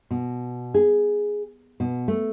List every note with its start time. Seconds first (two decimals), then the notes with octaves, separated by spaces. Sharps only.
0.11 B2
0.74 G#4
1.80 B2
2.08 A3